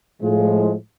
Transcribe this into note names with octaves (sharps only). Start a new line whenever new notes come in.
A2 F3 G#3